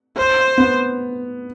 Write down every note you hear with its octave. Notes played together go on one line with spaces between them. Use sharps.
C5
B3